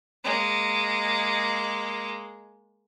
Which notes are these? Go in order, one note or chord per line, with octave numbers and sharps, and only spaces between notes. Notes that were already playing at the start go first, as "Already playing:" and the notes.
G#3 A#3